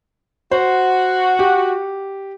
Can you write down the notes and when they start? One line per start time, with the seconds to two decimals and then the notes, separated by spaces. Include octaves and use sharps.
0.51 F#4 C5
1.39 G4